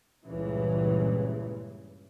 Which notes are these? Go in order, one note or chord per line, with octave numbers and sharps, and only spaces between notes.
C#2 G2 A#2 C#3 E3